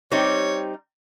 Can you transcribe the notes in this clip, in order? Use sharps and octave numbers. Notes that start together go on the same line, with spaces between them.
G3 C4 D#4 G4 C#5